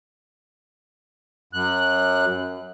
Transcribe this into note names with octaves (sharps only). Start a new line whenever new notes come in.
F#2 F#6